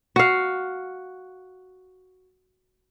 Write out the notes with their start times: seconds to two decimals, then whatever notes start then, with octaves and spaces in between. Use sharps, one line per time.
0.16 F#4 F5